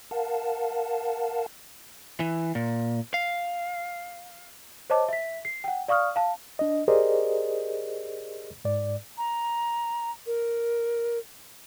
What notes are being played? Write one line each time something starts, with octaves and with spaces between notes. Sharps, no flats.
A#4 F5 F#5 A5
E3
A#2
F5
C5 C#5 D#5 A5 D6
E5 B6
C7
F#5 G5
D5 F5 C#6 D#6 F6
F5 A5
D4 D#5
G4 G#4 A#4 C5 D5 D#5
G#2 D5
A#5
A#4